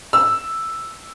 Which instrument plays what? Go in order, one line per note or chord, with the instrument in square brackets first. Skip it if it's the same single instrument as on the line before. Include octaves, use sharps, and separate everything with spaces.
[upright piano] E6